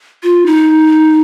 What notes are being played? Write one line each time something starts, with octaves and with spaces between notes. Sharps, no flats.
F4
D#4